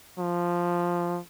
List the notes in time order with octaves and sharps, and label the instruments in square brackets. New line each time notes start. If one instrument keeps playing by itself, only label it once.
[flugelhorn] F3